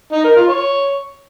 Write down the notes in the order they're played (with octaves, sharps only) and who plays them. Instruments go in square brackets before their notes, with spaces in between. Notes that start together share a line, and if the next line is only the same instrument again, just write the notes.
[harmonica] D#4
A#4
F4
C#5